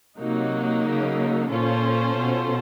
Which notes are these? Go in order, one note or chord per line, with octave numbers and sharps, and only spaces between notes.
C3 F#3 A#3 D#4
C#3
A#2 C#4 F4 A4 C5
B2